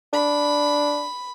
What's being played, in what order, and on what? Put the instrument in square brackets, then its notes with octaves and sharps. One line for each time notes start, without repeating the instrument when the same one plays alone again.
[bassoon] D4 [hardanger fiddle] B5